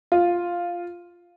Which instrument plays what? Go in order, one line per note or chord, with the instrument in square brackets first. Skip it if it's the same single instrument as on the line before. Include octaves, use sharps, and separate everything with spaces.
[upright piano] F4